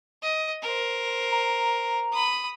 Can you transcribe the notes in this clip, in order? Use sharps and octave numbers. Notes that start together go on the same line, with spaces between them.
D#5
A#4 C5
A#5
B5 D#6